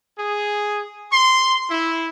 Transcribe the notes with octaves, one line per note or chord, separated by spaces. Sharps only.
G#4
C6
E4